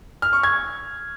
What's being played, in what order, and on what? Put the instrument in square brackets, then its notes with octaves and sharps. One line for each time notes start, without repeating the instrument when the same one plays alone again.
[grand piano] F6
C#6
G#6